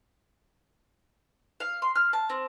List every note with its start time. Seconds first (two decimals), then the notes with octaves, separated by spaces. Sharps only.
1.60 F5
1.82 C6
1.95 F6
2.13 A5
2.30 C4